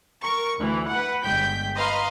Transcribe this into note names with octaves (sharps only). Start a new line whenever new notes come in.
A#4 C#6
D2 E3
B4 F#5
G1 G#3 G5 G6 B6
B4 D#5 F5 A#5 C6 F6